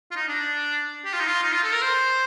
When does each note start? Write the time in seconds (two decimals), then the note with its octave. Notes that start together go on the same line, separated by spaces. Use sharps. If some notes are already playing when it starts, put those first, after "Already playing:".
0.11 F4
0.16 D#4
0.28 D4
1.05 G4
1.13 F4
1.20 D#4
1.27 F4
1.43 D#4
1.53 F4
1.63 A4
1.72 A#4
1.82 C5